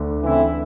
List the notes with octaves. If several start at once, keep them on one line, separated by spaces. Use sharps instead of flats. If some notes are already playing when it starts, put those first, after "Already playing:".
Already playing: D2 D3
C#3 E3 A3 C4 E4